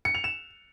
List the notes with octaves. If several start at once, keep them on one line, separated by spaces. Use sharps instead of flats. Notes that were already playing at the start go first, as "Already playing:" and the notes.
C#7
F7
E7